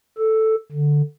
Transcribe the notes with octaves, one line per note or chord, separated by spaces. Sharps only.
A4
D3